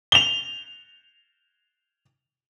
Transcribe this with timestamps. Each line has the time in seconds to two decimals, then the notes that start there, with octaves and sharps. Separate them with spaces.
0.12 F7 G7